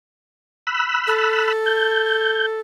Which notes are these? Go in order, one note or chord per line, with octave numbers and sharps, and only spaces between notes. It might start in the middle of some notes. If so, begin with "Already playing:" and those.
B5 E6 F#6
A4
G6